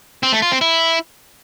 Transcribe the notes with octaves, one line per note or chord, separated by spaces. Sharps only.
C4
A3
F4
C4
E4